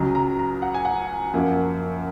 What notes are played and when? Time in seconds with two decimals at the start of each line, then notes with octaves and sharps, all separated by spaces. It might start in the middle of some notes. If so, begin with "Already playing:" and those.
Already playing: C#2 C#3 F#3 A#5
0.15 A#5
0.39 A#5
0.62 F#5
0.74 G#5
0.85 F#5
1.34 F#2 F3 A#3